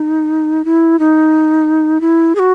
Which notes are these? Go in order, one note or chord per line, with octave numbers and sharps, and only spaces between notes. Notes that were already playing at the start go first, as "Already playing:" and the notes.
Already playing: D#4
E4
D#4
E4
G#4
F#4